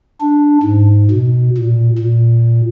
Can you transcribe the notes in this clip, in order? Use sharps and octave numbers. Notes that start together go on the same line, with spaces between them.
D4
G#2
B2
A#2
A#2